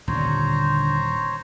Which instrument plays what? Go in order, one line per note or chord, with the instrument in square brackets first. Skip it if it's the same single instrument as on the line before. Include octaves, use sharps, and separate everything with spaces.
[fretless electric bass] D#1 [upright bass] D3 [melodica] C5 C#5 A#5